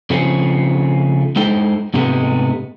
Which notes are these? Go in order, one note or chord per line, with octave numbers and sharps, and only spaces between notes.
C#3 F3 A3 C4 C#4
G#3 D#4 E4 A4 C5 G5
G#2 C3 G#3 A3 B3